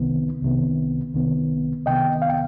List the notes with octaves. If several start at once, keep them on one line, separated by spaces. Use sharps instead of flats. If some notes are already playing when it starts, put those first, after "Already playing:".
Already playing: C2 C3 D#3 B3
C2 C3 D#3 B3
C2 C3 D#3 B3
C2 C3 D#3 B3 D#5 G5
F5
G5